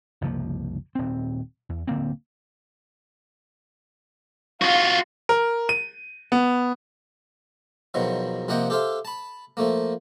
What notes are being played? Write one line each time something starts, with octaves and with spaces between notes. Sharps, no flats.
F#1 C2 F3 A#3
D#1 C4
E2
D1 D3 A#3 C4
F4 F#4 F5
A#4
D#7
B3
E2 B2 D#3 F3 F#3
C3 F3 A#3 D#5 F#5 G5
G4 A4 C5 E5 F5
A5 B5
F3 A3 A#3